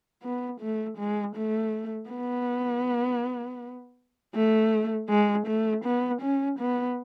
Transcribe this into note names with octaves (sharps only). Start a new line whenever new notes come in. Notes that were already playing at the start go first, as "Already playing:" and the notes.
B3
A3
G#3
A3
B3
A3
G#3
A3
B3
C#4
B3